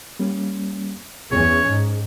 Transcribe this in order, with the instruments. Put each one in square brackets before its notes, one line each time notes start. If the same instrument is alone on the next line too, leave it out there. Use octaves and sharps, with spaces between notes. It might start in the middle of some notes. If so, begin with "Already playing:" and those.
[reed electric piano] G3 A#3 C#4
[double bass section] E2 C#4 [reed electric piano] G#4 [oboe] C#5
[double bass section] G#2